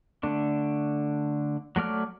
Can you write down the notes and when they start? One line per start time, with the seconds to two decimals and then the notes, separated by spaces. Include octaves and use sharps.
0.23 D3 A3 D4
1.76 F#3 A3 D5 F6